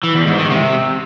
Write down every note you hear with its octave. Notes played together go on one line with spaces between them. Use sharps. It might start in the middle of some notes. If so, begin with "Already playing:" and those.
E3
E2
G#2
D#3
C3